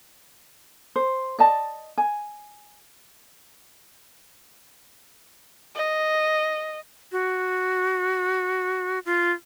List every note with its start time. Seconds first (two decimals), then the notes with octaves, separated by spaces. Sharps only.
0.96 C5
1.39 D5 D#5 A5
1.98 G#5
5.75 D#5
7.12 F#4
9.05 F4